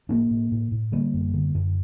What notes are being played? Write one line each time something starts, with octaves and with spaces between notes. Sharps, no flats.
A2 A#3 D4
A2
A2
A2
D3 G3 A#3
F#2
D3
F#2